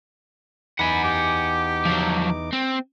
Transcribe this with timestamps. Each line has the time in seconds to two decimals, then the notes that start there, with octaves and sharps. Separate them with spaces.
0.79 E2 D#4 F#5 G#5 B5 D6
1.04 G4
1.85 F3 F#3
2.53 C4